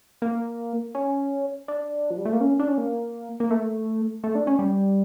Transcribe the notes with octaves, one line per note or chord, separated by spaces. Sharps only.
A#3
C#4
D4
F3
G3
A3
A#3
C#4
D4
C#4
A#3
A#3
A3
A3
D4
C#4
G3